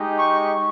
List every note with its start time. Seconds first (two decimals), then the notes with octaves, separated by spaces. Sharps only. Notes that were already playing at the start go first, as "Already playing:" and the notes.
Already playing: G#3 D#4 G4
0.17 C#6